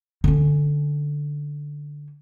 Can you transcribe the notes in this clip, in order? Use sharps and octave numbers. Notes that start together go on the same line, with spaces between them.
D3 C#4